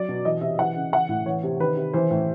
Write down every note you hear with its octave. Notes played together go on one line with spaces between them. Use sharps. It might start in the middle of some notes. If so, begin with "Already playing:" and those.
Already playing: F#3 D5
B2
E3 D#5
C3 E5
E3 F#5
C#3
E3 F#5
A2
E3 C#5
C3
D#3 B4
C3
E3 C5
A2